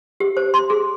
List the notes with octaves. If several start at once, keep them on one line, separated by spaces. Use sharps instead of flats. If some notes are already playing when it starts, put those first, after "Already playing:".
G4
C5
C6
G#4